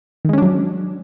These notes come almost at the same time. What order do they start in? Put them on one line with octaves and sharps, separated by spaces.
D#3 G#3 C#4 D4 F#3